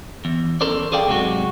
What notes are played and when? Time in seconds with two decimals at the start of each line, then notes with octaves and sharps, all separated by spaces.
0.25 E2
0.61 C#4 A4 A#4 C5 D5
0.92 G#4 A4 D5 F5 G5
1.07 G#2 C3 F#3 G#3 F#4